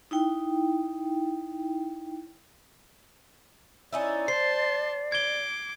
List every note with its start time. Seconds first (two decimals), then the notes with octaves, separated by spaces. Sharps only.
0.11 D#4 E4 G5
3.93 C#4 D#4 E4 D5
4.28 C5 A5 C6 C7
5.12 D6 G#6 G7